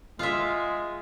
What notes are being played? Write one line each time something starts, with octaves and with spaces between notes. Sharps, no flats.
G#3 F4 E5